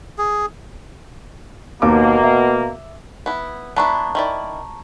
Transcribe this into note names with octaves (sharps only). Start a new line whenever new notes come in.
G#4
D#2 B2 A#3 D6
E5
B3 E4
B3 D4 E4 A5 A#5 C#6
D#3 E4 D5